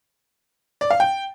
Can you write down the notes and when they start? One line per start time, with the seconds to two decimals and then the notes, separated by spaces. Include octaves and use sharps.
0.81 D5
0.91 F5
1.00 G5